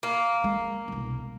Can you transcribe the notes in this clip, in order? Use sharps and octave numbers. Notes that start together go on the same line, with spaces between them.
A#3
G#3
E1 C2